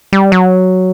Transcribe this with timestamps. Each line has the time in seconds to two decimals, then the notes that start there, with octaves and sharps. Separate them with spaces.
0.13 G3
0.32 F#3